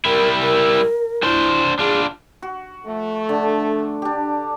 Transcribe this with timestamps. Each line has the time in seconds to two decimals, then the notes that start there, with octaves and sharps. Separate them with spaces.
0.05 G3 E4 A#4
0.42 A#4
1.23 D4 E4 C5
1.79 D4 F4 G#4
2.42 F#4
2.86 F3 A3
3.29 D3
4.02 D4 G4